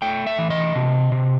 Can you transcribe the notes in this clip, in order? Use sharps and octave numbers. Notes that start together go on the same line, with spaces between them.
A3 G5
E5
E3
D#5
C3
C3